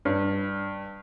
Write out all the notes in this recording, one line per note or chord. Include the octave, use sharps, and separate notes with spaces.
G2